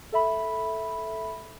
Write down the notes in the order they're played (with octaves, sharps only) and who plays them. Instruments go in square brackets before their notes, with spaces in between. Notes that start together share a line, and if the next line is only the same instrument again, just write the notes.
[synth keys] A4 E5 B5